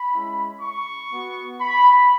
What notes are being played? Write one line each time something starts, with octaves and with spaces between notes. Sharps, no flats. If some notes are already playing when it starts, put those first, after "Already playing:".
Already playing: B5
G#3 C#4 E4
C#6
B3 F#4
B5